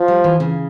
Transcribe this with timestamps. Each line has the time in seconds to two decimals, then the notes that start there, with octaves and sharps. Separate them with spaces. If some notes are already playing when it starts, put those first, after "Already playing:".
Already playing: F3
0.08 G3
0.24 E3
0.40 C#3